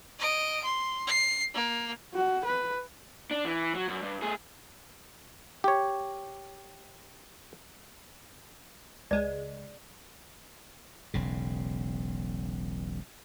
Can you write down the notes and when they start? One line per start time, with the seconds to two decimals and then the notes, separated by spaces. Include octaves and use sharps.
0.19 D#5 D7
0.63 C6
1.07 C7
1.54 A#3
2.14 F#4
2.45 B4
3.31 D4
3.45 E3
3.75 F#3
3.88 F#2
4.02 G2
4.22 A3 G#4
5.64 G4 C#5
9.11 C#2 G#3 D5
11.14 E1 B1 C#3